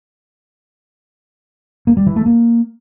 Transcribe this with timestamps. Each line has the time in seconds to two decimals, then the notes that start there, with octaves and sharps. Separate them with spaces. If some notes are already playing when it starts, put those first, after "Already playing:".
1.87 A#3
1.97 G3
2.06 E3
2.16 A3
2.26 A#3